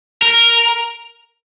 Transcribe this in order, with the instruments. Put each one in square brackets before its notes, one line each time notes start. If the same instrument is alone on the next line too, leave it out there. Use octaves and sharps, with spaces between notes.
[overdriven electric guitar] A#4